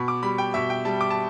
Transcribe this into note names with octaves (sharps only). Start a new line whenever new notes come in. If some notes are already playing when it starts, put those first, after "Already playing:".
Already playing: B2 B5
D6
G3 B5
G5
B2 E5
G5
G3 A5
D6
A5